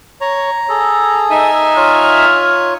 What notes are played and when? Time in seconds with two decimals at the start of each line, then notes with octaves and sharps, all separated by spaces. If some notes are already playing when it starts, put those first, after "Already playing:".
0.21 C#5 A#5
0.69 G#4 A4
1.30 D#4 E5 G#5
1.77 F4 C#5 F6